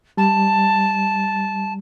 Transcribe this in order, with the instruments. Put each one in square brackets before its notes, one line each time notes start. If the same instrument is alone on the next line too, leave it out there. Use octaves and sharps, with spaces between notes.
[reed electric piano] G3 [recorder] A5